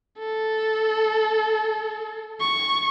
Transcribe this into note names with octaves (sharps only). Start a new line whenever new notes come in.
A4
C#6